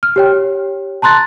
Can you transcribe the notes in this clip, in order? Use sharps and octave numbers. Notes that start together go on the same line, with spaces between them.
F6
G4 C#5 G5
A5 A#5 C6 F#6 A6